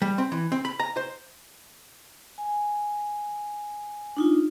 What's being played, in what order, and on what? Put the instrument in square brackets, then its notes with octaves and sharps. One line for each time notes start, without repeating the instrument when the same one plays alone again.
[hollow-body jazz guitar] G3
C4
E3
C4
B5
A#5
C5
[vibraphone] G#5
D4 D#4 F4